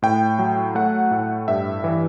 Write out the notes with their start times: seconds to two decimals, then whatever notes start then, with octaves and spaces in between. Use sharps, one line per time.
0.02 A2 G5
0.39 F#3
0.75 A3 F#5
1.11 A2
1.48 G2 E5
1.84 E3